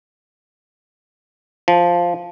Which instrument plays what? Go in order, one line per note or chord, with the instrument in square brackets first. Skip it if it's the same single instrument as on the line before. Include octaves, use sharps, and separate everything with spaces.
[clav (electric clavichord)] F3